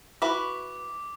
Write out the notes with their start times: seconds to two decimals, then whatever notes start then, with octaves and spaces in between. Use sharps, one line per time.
0.22 E4 F#4 B4 D6